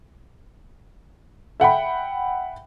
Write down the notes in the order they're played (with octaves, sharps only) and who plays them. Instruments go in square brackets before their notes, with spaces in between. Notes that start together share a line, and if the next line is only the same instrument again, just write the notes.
[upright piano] E5 F#5 G5 B5